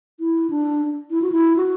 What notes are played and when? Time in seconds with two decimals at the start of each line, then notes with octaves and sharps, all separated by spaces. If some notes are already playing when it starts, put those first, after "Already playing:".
0.20 E4
0.50 D4
1.11 E4
1.22 F#4
1.32 E4
1.56 F#4